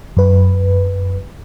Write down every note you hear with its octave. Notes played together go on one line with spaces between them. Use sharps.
F#2 B4